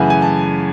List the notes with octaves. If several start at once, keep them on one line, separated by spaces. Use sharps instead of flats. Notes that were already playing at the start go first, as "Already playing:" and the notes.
Already playing: F#2 C#3 E3 A3 B4 F#5 G#5
G#5
A5